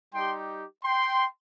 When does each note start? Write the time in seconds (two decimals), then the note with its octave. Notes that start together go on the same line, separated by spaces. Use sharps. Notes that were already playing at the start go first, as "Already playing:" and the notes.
0.14 G3 D#4 G4 G5 C6
0.84 G5 C6